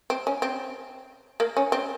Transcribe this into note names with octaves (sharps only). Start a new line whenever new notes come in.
C4
C#4
C4
A#3
C#4
C4